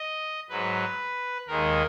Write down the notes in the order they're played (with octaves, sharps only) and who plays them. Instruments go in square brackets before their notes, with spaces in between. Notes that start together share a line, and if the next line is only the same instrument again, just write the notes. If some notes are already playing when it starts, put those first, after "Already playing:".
Already playing: [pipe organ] D#5
G#2 F#3 B4
D#2 D#3 G#3 A#4